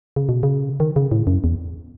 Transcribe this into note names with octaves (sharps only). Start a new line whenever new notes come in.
C#3
B2
C#3
D#3
C#3
A2
F#2
E2